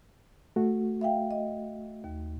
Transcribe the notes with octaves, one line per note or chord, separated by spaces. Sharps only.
A3 F#4
E5 F5 G5
D#5
D#2